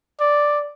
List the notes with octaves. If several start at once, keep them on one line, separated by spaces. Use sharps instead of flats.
D5